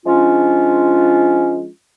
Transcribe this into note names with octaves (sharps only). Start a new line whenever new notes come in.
F3 G#3 C#4 D4 F4